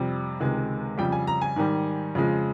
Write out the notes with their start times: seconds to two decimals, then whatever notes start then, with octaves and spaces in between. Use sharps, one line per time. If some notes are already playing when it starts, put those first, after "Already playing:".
Already playing: F2 C3 G3
0.40 C#2 C3 D#3 G#3
0.98 F2 C#3 G3 G5
1.12 G#5
1.27 A#5
1.42 G#5
1.56 G#2 D#3 G3
2.15 F2 C#3 F3 G#3